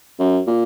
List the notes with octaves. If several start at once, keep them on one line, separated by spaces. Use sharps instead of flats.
F#2
A#2